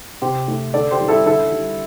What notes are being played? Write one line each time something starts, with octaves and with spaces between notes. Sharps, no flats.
C3 G4 C5
A3
D3 A4 D5
G4 C5
G3
E4 A4
D3 E4 A4
G3